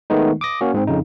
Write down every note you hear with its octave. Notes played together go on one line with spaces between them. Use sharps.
D#3 G#3 A3 B3 D#4
D6 D#6 A#6
A#3 C#4 F#4
G#2 C4
F2 C#3 D#4